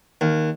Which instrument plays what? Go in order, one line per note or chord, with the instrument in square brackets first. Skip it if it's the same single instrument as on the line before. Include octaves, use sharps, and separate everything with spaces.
[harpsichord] D#2